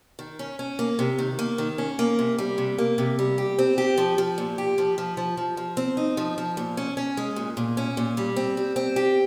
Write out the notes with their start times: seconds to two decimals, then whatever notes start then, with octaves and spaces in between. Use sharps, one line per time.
0.19 D#3
0.39 C#4
0.59 C#4
0.79 A#3
0.99 C3
1.19 D#3
1.39 A#3
1.58 D#3
1.78 C#4
1.99 A#3
2.19 C3
2.38 G3
2.58 C3
2.78 A#3
2.98 C3
3.19 G3
3.38 G4
3.59 C4
3.78 G4
3.98 F3
4.18 F3
4.38 A#2
4.58 G4
4.78 F3
4.98 F3
5.17 F3
5.37 F3
5.57 F3
5.77 C4
5.97 D#4
6.17 F3
6.38 F3
6.57 A#2
6.77 C#4
6.97 C#4
7.17 G#3
7.36 A#2
7.57 A#2
7.77 C#4
7.97 A#2
8.17 G3
8.36 C4
8.57 G3
8.76 C4
8.96 G4